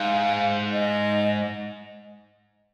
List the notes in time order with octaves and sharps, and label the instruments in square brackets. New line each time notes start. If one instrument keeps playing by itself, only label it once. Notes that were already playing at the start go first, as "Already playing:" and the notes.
Already playing: [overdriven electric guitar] G#2 [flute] F5
[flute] D#5